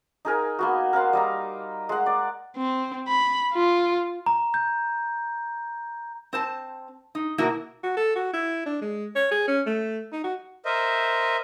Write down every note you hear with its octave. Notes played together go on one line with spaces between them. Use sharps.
D#4 G#4 A#4 G#5
A#3 B3 F#4
A#4 F5 F#5 C6
G3 D#5 A#5
G#3 F#5
D5
C4
B5
F4
A#5
G6
C4 C5 A5
D#4
B2 A#3 E4 F#4 A#4
F#4
A4
F#4
E4
D4
G#3
C#5
G#4
C#4
A3
D#4
F#4
A#4 C5 D#5 E5